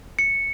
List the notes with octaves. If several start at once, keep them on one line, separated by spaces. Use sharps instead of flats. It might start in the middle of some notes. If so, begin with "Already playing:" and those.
C#7